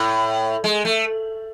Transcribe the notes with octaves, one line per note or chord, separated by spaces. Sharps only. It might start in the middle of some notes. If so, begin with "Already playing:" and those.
Already playing: A2
G#3
A3